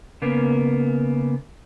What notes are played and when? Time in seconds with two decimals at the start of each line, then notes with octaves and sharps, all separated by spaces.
0.22 C#3 A#3 B3